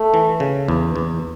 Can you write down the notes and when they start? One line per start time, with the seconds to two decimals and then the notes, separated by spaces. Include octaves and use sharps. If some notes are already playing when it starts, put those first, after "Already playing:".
Already playing: A3
0.14 E3
0.40 C#3
0.68 E2
0.96 E2